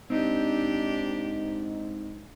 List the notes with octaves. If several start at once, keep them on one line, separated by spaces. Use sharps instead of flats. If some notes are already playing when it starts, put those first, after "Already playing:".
G#2 C4 D4 D#4 G4